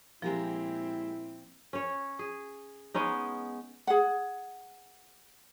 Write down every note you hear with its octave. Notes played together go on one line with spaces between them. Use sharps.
A#2 F3 G#3 C4 E4 G4 A#4
C#4 C#5
G#4
G#3 B3 C#4 D#4
G#4 F#5